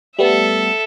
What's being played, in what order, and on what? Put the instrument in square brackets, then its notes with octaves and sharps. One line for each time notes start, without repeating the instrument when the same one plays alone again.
[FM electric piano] G3 A3 B3 [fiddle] A4 E5